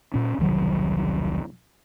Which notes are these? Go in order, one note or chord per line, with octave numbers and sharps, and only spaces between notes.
A#2 C#4
E1 C2 D#3 F#3